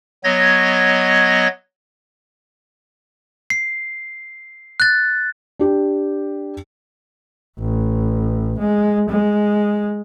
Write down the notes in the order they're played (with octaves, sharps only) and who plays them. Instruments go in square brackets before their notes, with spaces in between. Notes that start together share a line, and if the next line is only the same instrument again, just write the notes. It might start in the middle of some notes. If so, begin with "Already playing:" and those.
[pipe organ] F#3 B3 C#5 D#5 G#6 A#6
[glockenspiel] C7
F#6 A6
[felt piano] D4 G4
[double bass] A1
G#3
G#3